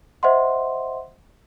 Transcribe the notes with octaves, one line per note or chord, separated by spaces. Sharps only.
C5 D#5 E5 F#5 C6